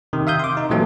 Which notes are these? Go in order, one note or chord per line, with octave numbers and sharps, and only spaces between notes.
C3 D#3
E5 F5 D#6 G6
C6 D6
D#4
A#2 E3 F#3 A3 C4 G4